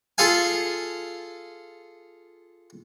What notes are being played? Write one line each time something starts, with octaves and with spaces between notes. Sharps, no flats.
F4 G#4 A4 F5 G#5